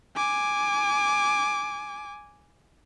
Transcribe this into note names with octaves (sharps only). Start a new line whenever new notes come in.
G#5 D6